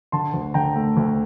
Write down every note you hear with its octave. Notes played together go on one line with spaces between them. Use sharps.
D3 A5 C6
D2
D3 G5 A#5
A3
D2